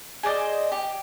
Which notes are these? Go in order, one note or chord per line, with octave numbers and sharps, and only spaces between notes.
G#4 C5 D5 D#5
G4